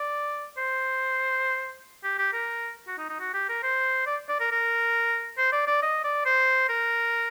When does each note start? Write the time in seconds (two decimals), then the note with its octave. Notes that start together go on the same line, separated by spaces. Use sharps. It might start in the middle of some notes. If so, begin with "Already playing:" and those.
Already playing: D5
0.58 C5
2.04 G4
2.18 G4
2.33 A#4
2.88 F#4
2.98 D#4
3.10 D#4
3.20 F#4
3.34 G4
3.49 A#4
3.63 C5
4.07 D5
4.29 D5
4.40 A#4
4.52 A#4
5.38 C5
5.53 D5
5.67 D5
5.83 D#5
6.05 D5
6.26 C5
6.69 A#4